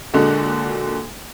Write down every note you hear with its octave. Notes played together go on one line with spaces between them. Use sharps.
A#2 D3 G#3 F#4 A4